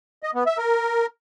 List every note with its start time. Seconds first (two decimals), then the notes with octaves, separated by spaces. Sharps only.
0.23 D#5
0.35 B3
0.46 E5
0.58 A#4